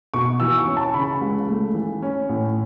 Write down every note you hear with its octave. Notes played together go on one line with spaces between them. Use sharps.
B2 C#6
E3 E6
C#6
C#4
A5
C#3 B5
C#2
A3
E3
C#4
A2